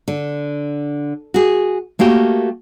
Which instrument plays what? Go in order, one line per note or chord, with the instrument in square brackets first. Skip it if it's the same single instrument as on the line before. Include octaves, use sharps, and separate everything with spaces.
[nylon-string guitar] D3
F#4 G#4
A3 A#3 F#4 G4